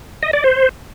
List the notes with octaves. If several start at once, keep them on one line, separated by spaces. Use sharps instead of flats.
D#5
D5
C5